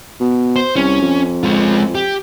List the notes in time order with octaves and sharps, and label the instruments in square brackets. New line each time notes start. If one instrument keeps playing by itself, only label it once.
[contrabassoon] B2
[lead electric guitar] C5
[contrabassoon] C2 [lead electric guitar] C#4
[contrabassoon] F2
[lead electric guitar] G#3 F4
G4